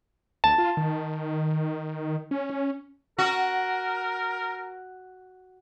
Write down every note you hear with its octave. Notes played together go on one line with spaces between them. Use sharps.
D2 A5
F4
D#3
C#4
F#4 A#4